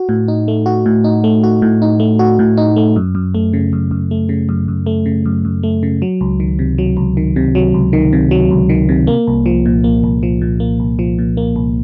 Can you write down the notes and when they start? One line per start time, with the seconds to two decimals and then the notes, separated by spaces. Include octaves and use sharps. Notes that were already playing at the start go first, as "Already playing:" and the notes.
Already playing: F#4
0.09 A2
0.28 D#4
0.48 A3
0.66 F#4
0.86 A2
1.04 D#4
1.24 A3
1.44 F#4
1.62 A2
1.82 D#4
2.00 A3
2.19 F#4
2.39 A2
2.57 D#4
2.76 A3
2.96 F#2
3.15 F#2
3.35 A3
3.53 C#3
3.73 F#2
3.91 F#2
4.11 A3
4.29 C#3
4.49 F#2
4.68 F#2
4.86 A3
5.06 C#3
5.26 F#2
5.45 F#2
5.63 A3
5.83 C#3
6.02 F#3
6.21 C#2
6.40 D#3
6.59 C3
6.78 F#3
6.97 C#2
7.17 D#3
7.36 C3
7.55 F#3
7.74 C#2
7.93 D#3
8.13 C3
8.31 F#3
8.51 C#2
8.69 D#3
8.89 C3
9.07 A#3
9.27 C2
9.46 F3
9.66 A#2
9.84 A#3
10.04 C2
10.23 F3
10.42 A#2
10.60 A#3
10.80 C2
10.99 F3
11.19 A#2
11.37 A#3
11.56 C2